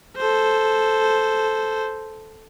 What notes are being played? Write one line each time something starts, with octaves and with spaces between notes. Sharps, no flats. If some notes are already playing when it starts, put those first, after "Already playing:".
A4 C5